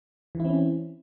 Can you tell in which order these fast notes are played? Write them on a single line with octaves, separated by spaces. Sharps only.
E3 E4 C4 C#4